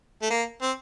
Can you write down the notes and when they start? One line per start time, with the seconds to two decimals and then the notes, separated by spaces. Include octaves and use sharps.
0.22 A3
0.30 A#3
0.62 C4